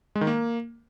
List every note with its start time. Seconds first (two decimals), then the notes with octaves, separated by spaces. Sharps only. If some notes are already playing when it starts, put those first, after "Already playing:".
0.15 G#3
0.21 D#3
0.27 A#3